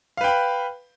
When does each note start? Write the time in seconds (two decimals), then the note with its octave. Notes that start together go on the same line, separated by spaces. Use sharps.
0.17 F5
0.21 B4
0.24 G5
0.27 B5